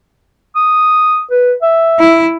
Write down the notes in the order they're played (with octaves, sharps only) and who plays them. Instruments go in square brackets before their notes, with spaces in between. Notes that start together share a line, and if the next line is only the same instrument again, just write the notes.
[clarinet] D#6
B4
E5
[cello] E4